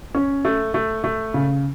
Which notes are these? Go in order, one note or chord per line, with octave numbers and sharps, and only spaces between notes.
C#4
A3
A3
A3
C#3